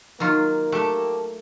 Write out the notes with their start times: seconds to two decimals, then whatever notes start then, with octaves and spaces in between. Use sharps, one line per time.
0.20 D#3 F#3 A#3 F4
0.72 A3 G4 A4